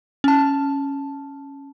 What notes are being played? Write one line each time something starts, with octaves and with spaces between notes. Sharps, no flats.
C#4 A5